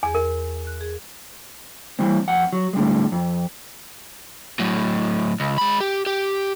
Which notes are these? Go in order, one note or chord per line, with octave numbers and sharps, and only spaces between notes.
E2 G#4 G#5
A#4
F#6
G#4
E3 G3 C4
F2 F#5
F#3
A2 D3 G3 G#3
F2
A2 F#3
C#2
G#3 B5
G4
G4